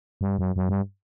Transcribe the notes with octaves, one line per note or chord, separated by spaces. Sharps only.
G2
F#2
F#2
G2